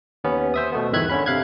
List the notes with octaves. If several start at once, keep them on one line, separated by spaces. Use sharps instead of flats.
D#2 B3 C#4
C5 E5 D#6
B2 A3 B3
G1 E2 D#3 E5 F#6 G#6
D3 C#4 B5
C3 F5 F#6 G#6